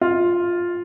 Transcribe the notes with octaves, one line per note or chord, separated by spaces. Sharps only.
F4